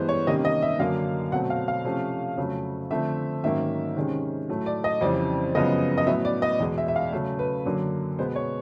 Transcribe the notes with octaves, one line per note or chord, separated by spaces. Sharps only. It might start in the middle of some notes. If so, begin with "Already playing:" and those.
Already playing: G2 E3 G#3 B3 C5
C#5
C3 D#3 G3 A#3 C#4 D#5
D#5
E5
F#2 D3 F#3 A#3 F5
B2 F#3 A3 C4 F#5
F5
F5
C3 F3 A3 C#4
F2 C#3 F#3 A3
D3 F3 A3 C4 E5
G#2 D#3 F#3 A#3 C#4 E5
C3 D#3 G#3 C#4
A2 F#3 A3
D5
D#5
F2 C#3 E3 G3 C4 D5
F#2 C#3 F3 G#3 B3 D#5
D#5
A2 F#3 B3 E5
D5
D#5
E2 B2 G#3
E5
E5
F5
C#3 F#3 A3
B4
F#2 D3 F#3 A#3
B2 G#3 B3 C5
C#5